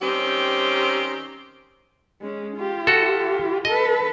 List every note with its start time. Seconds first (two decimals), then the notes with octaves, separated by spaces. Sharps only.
0.01 D#3 G3 C4 C#4 G4
2.21 G#3 C#4
2.57 F4 G4
2.87 F#4 A4
3.65 A4 B4 D#5